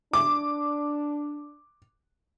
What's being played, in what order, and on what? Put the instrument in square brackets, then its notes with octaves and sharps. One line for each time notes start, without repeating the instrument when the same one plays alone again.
[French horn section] D4 [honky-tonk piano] D6